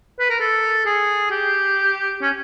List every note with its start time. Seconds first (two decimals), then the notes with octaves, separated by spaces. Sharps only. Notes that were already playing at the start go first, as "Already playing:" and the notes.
0.20 B4
0.30 A#4
0.40 A4
0.86 G#4
1.31 G4
2.21 C#4